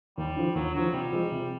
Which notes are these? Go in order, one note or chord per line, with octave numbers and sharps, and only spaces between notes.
D#2 G3
D3 F3
D#2 F#3
D3 F3 F#3
C3 G3
F3 G#3
C3